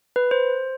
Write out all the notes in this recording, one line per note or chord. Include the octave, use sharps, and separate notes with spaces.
B4
C5